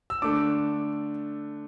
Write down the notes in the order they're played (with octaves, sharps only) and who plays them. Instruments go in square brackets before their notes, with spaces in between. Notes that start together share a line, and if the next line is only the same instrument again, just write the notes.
[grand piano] E6
D3 A3 D4 D6